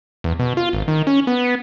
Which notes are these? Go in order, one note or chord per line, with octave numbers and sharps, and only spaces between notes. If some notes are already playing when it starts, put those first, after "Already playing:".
E2
B2
F4
G#1
D#3
C#4
B3